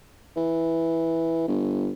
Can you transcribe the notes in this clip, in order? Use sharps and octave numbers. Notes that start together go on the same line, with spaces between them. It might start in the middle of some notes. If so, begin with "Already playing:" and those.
E3
G1